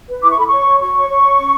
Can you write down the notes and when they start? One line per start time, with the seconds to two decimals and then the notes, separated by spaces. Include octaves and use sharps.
0.09 B4
0.23 E4 D6
0.30 C#6
0.37 A4 B5
0.47 C#5 C#6
0.65 C#5
0.80 F#4 C#6
0.94 C#5
1.08 C#5
1.22 C#5
1.37 C#4